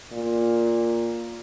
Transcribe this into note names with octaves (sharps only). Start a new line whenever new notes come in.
A#2